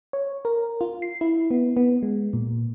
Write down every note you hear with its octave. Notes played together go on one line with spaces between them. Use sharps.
C#5
A#4
F4
C7
E4
B3
B3
G#3
A#2